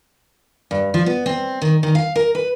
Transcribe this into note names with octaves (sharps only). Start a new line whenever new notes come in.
G2
F3
B3
C4
D#3
D#3
F5
A#4
B4